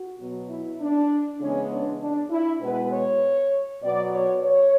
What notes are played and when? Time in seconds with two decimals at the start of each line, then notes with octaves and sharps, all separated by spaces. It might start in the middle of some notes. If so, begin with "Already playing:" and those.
Already playing: F#4
0.18 B2 F#3 B3
0.49 E4
0.80 D4
1.39 C#3 E3 G#3 B3 C#4
1.70 D4
2.00 D4
2.30 E4
2.60 B2 G#3 B3 B4
2.91 C#5
3.82 B2 F#3 B3 D5
4.12 C#5
4.42 C#5